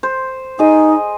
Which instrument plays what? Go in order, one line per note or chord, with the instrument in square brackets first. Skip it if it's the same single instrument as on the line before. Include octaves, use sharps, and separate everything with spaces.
[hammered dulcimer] C5
[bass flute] D#4 [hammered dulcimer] G#4 D#5